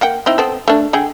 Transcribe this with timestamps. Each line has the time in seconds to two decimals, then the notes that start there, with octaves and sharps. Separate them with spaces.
0.01 A#3 F#5 G5
0.26 C4 D#4 E4
0.38 B3 C4 A4
0.68 A3 D4
0.93 D3 G#4 G5